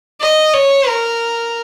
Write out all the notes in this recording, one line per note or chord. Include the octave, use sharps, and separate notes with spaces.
D#5
C#5
A#4